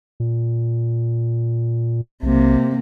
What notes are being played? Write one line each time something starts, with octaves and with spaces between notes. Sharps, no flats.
A#2
B1 C3 A#3